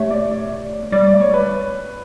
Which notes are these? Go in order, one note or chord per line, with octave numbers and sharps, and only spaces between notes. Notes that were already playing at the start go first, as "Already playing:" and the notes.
Already playing: A3 G4 C#5
D5
D5
G3 D5
D5
A3
C#5
G3 B4